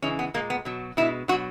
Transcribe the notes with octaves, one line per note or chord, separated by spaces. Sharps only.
C#3 E3 G#3 C#4
B3
A#2 G#3 A#3
B3
B2 F#3
B2 G#3 E4
B2 F#3 F#4